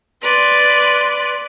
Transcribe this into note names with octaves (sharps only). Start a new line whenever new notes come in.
B4 D5 C6